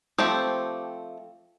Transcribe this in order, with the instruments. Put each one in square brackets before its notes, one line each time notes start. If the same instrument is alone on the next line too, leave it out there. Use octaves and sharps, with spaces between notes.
[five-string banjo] F3 A3 C4 G4